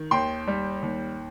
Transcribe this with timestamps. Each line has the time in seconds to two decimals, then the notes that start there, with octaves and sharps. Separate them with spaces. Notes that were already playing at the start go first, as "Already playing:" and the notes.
Already playing: D#3
0.11 D#2 G5 C6
0.47 G3
0.82 D#2